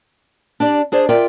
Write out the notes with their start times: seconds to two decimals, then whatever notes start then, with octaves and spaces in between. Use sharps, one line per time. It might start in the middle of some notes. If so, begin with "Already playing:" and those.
0.60 D4 G4 D5
0.92 D4 G#4 C5 D5
1.09 F4 A#4 D5 E5 G5